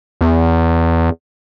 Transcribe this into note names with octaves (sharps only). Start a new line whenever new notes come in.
E2